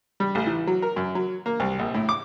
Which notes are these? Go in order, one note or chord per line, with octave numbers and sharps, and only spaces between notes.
G3
A1
E3
F#3
A#4
F#2
F#3
A#3
C2
A#1
A2
D6